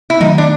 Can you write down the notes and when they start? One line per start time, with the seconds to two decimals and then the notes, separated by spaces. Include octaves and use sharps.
0.10 E4
0.20 D#3 F#3 A3 D#4
0.38 D4